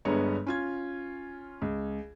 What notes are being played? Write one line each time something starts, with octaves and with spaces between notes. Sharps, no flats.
G1 G2 G#3 B3 C#5 A#5
C#4 F4 G#6
C#2